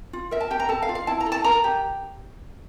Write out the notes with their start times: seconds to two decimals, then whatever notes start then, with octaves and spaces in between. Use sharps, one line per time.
0.13 F4
0.31 A#4 E5
0.40 A5
0.51 G4 G5
0.60 A#5
0.69 A4 A5
0.82 F5
0.89 F4
0.95 F5
1.07 E4 A5
1.20 A#5
1.26 A4
1.32 A5
1.44 A#4 A#5
1.64 G4